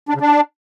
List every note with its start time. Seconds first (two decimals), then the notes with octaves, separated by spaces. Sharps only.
0.09 D4
0.15 C#3
0.21 D4